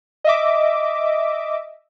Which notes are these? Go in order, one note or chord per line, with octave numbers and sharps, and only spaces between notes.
D#5 E5 D6